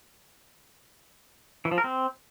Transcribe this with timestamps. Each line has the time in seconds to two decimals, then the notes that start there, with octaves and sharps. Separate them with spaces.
1.65 E3
1.71 F3
1.78 A#4
1.84 C4